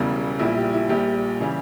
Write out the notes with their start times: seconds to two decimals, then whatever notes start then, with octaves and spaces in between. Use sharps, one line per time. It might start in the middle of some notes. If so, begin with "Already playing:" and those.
Already playing: E1 E2 C#3 G3
0.39 A#1 A#2 G3 E4
0.57 G4
0.73 E4
0.89 A#1 A#2 G3 G4
1.40 C#3 E3 G3